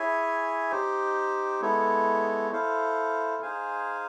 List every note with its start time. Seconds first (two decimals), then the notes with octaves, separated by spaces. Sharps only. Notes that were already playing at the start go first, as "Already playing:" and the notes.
Already playing: E4 G#4 C#5 E5 G#5
0.71 D#4 G4 C5
1.61 G#3 B3 E4 A4 C#5
2.51 E4 A4 C5 F5
3.42 D#4 G#4 C5 F5 G#5